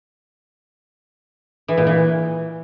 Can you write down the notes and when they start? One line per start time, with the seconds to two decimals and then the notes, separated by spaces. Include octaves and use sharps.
1.68 E3
1.78 A#2
1.87 E3